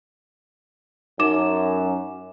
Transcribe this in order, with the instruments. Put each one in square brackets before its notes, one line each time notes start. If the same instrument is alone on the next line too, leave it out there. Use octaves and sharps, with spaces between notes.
[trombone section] F#2 [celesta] D#4 D6 E7